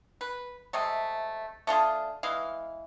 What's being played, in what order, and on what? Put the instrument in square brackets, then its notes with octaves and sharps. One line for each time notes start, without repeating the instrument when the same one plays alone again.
[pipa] B4
C3 G#3 A3
A3 D4 F4 G#4
E3 G#3 F5